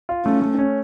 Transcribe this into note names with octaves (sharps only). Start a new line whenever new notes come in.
F4
A3 C#4
A3
C#4